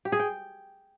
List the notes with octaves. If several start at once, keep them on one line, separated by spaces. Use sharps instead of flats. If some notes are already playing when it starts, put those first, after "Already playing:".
G4
G#4
G5